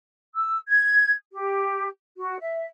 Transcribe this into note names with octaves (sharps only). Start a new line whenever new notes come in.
E6
G#6
G4
F#4
E5